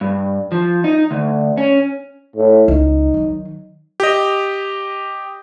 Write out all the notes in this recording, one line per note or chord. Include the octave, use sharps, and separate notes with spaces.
G2
F3
D#4
D2
C#4
A2
C#2 D#4
D#3 F#3
G4 D#5